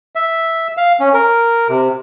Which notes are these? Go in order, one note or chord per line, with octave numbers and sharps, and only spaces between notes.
E5
F5
C#4
A#4
C3